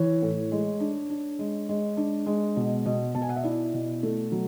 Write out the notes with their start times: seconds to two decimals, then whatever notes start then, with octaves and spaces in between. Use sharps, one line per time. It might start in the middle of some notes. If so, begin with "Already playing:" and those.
Already playing: E3 C#5
0.22 A2
0.51 G#3
0.80 D4
1.10 D4
1.39 G#3
1.69 G#3
1.97 D4
2.26 G#3
2.56 B2
2.86 B2
3.15 B2 A5
3.22 G#5
3.29 F#5
3.36 E5
3.44 E4 D5
3.74 B2
4.03 A3
4.32 F#3